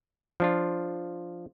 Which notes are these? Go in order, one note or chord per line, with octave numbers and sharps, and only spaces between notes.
F3 D4 F4